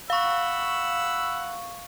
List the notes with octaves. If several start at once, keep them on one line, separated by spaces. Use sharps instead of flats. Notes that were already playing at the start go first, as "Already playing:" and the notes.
F5 F#5 B5 C#6 E6